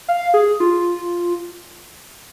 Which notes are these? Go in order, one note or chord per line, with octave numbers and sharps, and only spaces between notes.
F5
G#4
F4